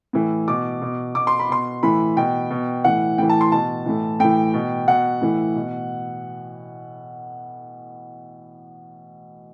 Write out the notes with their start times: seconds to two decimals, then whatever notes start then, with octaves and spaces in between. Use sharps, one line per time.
0.13 A2 E3
0.48 B2 D6
0.81 B2
1.15 B2 D6
1.27 C6
1.39 B5
1.49 B2 C6
1.83 A2 E3 B5
2.17 B2 G5
2.50 B2
2.84 A2 E3 F#5
3.18 A2 E3 G5
3.29 A5
3.41 C6
3.52 B2 A5
3.86 A2 E3
4.20 A2 E3 G5
4.54 B2
4.87 B2 F#5
5.21 A2 E3
5.55 B2